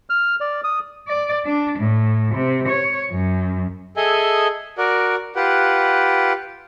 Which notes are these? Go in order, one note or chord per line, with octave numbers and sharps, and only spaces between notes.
F6
D5
D#6
D5
D4
A2
C3
C#5
F#2
G#4 A4 D#5 E5 G#5
F#4 A#4 D5
F4 G4 B4 F#5